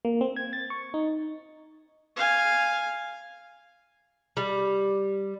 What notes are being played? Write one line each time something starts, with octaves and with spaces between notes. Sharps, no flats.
A#3
C4
G#6
A6
C#6
D#4
F5 G#5
G3